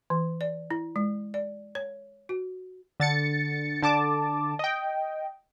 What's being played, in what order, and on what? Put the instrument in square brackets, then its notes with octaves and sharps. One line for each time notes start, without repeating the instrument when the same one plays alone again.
[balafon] E3
D5
E4
G#3
D5
C#5
F#4
[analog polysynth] D3 A6 C#7
D3 A5 D6
D#5 G5